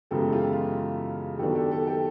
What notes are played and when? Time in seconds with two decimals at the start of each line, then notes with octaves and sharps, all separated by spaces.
0.11 F#2 C#3 E3 G#3 B3 G4 A4
0.32 F4 G4
0.53 F4
1.39 D#3 F#3 B3 D4 G4 A4
1.55 G4 A4
1.71 G4 A4
1.87 G4 A4